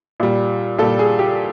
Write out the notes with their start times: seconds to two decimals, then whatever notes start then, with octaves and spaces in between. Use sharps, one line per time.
0.20 A#2 G3
0.78 A#2 A4
0.82 G3
0.99 G#4
1.19 G4